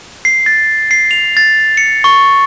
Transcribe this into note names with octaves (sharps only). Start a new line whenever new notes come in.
C7
A6
C7
F7
A6
C#7
C#6